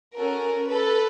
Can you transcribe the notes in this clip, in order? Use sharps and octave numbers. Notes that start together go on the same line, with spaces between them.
C#4 F#4 A4 A#4
A4 B4